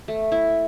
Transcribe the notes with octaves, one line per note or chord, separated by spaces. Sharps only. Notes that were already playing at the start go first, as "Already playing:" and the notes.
A3
E4